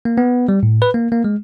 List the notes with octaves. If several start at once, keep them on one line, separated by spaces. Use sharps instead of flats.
A#3
B3
G3
A2
B4
A#3
A#3
G#3